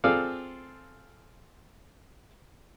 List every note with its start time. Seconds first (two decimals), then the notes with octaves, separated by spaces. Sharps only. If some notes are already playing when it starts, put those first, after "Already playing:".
0.04 C4 F4 G#4 A4 D5 F5